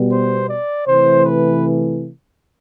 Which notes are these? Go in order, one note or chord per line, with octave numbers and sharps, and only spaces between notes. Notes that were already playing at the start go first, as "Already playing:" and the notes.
Already playing: B2 G3 B3
C5
D5
C3 E3 A3 C5
B4